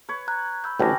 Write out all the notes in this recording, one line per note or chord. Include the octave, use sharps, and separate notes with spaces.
B4 C#5
A#5 F#6 G#6
B5 E6 G6
A1 D2 C#4 D4 B4 G5 A#6